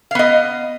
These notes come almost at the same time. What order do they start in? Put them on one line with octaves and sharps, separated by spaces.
F5 B3 D#5